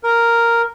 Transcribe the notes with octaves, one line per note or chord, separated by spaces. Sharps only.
A#4